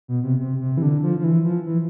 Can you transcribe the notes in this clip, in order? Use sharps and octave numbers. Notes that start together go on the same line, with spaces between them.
B2
C3
C3
C3
E3
D3
F3
F3
E3
F3
E3